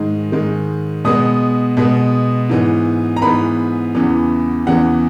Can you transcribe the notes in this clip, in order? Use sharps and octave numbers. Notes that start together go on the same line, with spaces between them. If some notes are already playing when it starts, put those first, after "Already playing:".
Already playing: G#2 D#3 G#3
G#2 D#3 G#3
B2 G#3 B3 D#6
B2 G#3 B3
G#2 E3 B3
A#5
G#2 E3 B3 B5
E2 C#3 E3 B3
E2 C#3 E3 B3 F#5